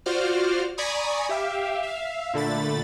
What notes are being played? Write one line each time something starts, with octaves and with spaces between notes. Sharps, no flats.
F4 F#4 C5 D5 F6
D5 G#5 A#5 B5 C#6 D#6
G4 E5 F5
E5 F5
A#2 D3 A3 B5 A6